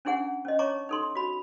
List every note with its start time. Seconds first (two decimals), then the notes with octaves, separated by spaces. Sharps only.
0.05 C#4 D4 E4 G#4 F#5
0.45 C#4 D#5
0.59 C#5 A5 A#5 C#6 D6
0.89 D#4 A4 C6
1.15 F#4 B5